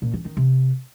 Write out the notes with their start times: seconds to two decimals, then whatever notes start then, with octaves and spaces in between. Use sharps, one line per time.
0.02 A#2
0.14 E3
0.25 D#3
0.37 C3